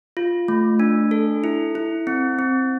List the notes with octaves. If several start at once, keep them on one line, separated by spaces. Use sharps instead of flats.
F4
A3
D4
A4
E4
E4
C4
C4